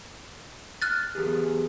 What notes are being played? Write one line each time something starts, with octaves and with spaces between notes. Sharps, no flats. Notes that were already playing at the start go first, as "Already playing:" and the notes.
F6 F#6 A6
E2 G4 G#4